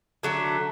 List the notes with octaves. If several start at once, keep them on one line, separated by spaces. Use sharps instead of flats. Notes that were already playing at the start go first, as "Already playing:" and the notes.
D3 F#3 A3